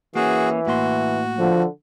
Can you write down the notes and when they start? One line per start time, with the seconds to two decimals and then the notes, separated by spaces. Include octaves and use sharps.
0.15 E3 A#3 C#4 F#4 G#4
0.67 A2 A#3 F#4 C6
1.38 D3 F3